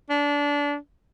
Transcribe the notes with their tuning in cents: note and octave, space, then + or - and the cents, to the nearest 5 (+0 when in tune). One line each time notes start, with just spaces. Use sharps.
D4 -25